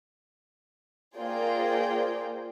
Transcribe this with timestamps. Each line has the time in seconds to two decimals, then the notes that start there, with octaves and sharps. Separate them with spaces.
1.17 A#3 F4 G#4 C5 D5 G5